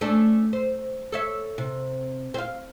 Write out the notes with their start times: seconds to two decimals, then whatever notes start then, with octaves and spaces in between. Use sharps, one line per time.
0.01 A3 C#4 D4
0.53 C5
1.12 A4 C#5 E5
1.58 C3
2.34 C4 F5